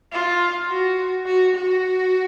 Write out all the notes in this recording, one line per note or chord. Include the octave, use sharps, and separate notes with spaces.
F4
F#4
F#4
F#4